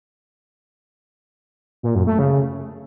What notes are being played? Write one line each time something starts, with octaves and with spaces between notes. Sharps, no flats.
A#2
F#2
A3
C#3